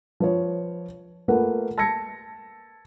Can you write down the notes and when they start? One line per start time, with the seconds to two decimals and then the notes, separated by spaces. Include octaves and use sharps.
0.20 F3 B4 C#5
1.28 A3 A#3 F4 A#4 B4 F#5
1.78 A5 E6 G#6 A#6 C#7